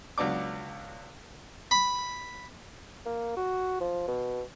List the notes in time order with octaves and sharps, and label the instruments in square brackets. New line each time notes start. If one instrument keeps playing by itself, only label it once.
[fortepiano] C#2 F#3 B3 D4 D6
[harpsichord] B5
[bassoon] A#3
F#4
F3
B2